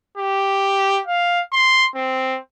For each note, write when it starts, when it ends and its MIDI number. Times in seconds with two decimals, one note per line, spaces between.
0.17 1.00 67
1.07 1.41 77
1.53 1.85 84
1.95 2.38 60